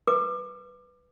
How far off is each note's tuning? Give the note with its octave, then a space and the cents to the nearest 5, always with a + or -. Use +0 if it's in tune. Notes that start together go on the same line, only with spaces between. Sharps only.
B4 +0 D6 +30